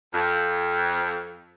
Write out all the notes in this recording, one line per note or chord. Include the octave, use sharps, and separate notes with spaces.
F2